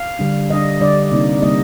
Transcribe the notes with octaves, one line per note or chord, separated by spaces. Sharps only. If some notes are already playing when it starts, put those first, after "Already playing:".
Already playing: F5
D3 G3 D4
D3 G3 D4 D#5
D3 G3 D4 D5
C3 G3 A#3 D#4
C3 G3 A#3 D#4 D#5